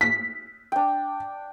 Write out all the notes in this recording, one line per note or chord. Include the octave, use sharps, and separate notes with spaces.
B6
D4 G5